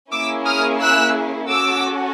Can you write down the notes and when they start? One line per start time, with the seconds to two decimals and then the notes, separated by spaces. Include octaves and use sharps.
0.12 A#3 C#4 E4 G#4 D6 E6
0.46 D#6 F6
0.80 E6 F#6
1.49 C#4 F#4 A4 D6 E6